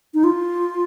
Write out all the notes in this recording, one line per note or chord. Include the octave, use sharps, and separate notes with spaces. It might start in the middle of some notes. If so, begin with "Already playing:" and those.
D#4
F4